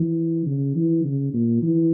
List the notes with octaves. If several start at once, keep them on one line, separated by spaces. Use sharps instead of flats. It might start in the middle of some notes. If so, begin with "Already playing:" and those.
Already playing: E3
C#3
E3
C#3
A#2
E3